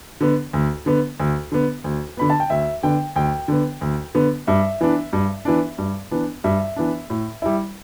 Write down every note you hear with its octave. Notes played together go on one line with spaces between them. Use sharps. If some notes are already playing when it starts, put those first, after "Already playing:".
D3 B3
D2
D3 B3
D2
D3 B3
D2
D3 B3 B5
A5
G5
D2 E5
D3 B3 G5
D2 G5
D3 B3
D2
D3 B3
G2 E5
E3 B3 D4
G2
E3 B3 D4
G2
E3 B3 D4
G2 E5
E3 B3 D4
A2
G3 E4